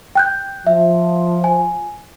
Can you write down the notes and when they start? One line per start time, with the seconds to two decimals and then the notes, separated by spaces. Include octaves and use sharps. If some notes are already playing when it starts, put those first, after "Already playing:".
0.15 G5 F#6 G6
0.67 F3 E5
1.44 G#5